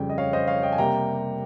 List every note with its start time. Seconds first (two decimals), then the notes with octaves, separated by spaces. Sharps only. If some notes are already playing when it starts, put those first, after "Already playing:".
Already playing: F2 C#3 G3 G5
0.09 D#5
0.18 C#5 F5
0.33 C5 D#5
0.47 C#5 F5
0.63 D#5 G5
0.72 G#5
0.78 C3 G3 A#3 G5 A#5